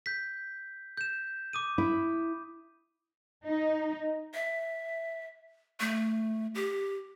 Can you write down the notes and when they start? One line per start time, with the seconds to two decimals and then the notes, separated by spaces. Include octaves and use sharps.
0.06 G6 B6
0.97 G6 E7
1.53 D6 D#6 D#7
1.78 E4
3.46 D#4
4.34 E5
5.80 A3
6.55 G4